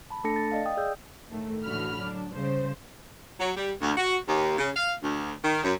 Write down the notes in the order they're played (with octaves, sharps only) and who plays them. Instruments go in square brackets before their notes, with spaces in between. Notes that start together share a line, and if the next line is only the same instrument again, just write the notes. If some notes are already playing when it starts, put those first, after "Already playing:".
[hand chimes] A5 B5
A3 D4 A4 A5 A#6 C#7
A6
D5 D#5 F5
G5 D#6
G#4 D5 E6 G6
[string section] A2 D#3 A3
A2 D3 E3 F#4 B5 F6
F#3 D4
C#3 G3 C5
[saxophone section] F#3
G3
D2
F#4
D#2
C#3
F5
D2
D#3
F#2